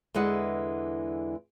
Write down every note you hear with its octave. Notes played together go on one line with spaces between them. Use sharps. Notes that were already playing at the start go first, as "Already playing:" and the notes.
E2 D3 E3 G#3 F#5